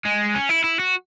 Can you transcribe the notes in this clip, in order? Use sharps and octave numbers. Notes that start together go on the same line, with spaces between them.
G#3
C#4
E4
E4
F#4